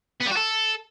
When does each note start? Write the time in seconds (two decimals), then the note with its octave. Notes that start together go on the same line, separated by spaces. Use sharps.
0.21 B3
0.26 G3
0.32 F#4
0.37 A4